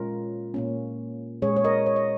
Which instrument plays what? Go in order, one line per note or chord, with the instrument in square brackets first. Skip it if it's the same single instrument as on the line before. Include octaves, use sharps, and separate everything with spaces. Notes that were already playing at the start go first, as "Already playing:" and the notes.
Already playing: [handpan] A#2 G#3 C#4 F4 A#4
A#2 A#3 C#4
A#2 G#3 C#4 G#4 C#5
C#5
A#4 D#5
C#5
D#5